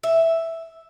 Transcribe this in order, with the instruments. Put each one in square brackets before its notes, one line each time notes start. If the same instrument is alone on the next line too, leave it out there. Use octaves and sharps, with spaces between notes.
[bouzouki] E5